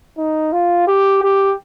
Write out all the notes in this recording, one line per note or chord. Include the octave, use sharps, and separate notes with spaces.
D#4
F4
G4
G4